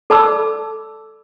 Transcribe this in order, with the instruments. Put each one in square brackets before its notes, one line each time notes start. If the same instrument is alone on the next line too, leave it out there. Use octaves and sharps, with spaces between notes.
[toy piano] A4 D5 A5 B5 D6 E6